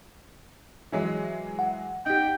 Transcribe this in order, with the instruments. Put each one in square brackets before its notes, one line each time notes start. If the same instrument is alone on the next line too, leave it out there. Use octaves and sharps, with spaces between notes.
[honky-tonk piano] E3 F#3 G#3
[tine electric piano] F#5
[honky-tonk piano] D#4 G4 [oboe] G5